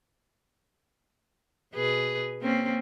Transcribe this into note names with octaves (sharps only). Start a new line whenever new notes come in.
B2 G#4 B4
A#3 C4 C#4